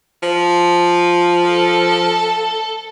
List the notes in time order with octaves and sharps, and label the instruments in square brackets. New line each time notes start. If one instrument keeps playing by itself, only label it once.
[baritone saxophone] F3
[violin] A4